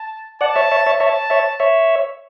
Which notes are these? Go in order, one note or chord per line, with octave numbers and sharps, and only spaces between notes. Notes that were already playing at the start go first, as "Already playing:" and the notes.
Already playing: A5
D5 F#5 A5
C#5 E5
C#5 E5
C#5 E5
C#5 E5 A5
C#5 E5
C#5 E5